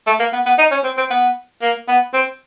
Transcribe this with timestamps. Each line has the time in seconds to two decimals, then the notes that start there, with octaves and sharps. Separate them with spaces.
0.07 A3
0.20 A#3
0.33 B3
0.46 B3
0.58 D#4
0.71 C#4
0.84 C4
0.97 C4
1.10 B3
1.62 A#3
1.88 B3
2.14 C4